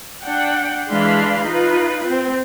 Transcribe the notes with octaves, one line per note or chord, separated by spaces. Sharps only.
D4 F#5 G5
E3 G#3 D4 F5 B5 C6
D#4 F4 B4
C4